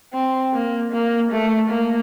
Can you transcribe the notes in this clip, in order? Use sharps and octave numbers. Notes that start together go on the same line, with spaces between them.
C4
A#3
A#3
A3
A#3